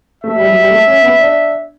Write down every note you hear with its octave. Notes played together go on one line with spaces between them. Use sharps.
A3 E5
G3
F#3
G3
A3
C#4
B3
D4